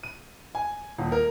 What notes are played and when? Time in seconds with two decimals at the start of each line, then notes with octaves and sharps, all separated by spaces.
0.03 D#7
0.55 G#5
0.98 D#1
1.12 A#4